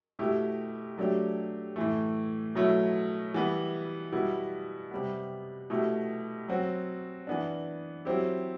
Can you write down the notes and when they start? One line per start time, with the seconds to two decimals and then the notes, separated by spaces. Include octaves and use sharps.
0.19 B2 A3 E4 G4
0.98 F#3 A3 D4 G4
1.76 A2 E3 A3
2.55 B2 F#3 A3 E4
3.34 E3 G3 B3
4.12 B2 G3 B3 E4
4.91 C3 G3 B3
5.70 B2 A3 E4 G4
6.48 F#3 C4 F#4
7.27 E3 B3 D4
8.05 F#3 C4 E4 G4